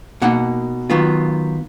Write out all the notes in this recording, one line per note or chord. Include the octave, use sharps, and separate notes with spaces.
B2 A#3 D#4 F#5
D#3 F#3 B3 F4